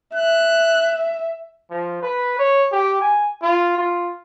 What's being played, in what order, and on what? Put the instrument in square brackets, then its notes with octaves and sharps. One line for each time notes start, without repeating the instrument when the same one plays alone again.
[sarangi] E5 [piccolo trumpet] F#6
[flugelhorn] F3
B4
C#5
G4
G#5
F4
F4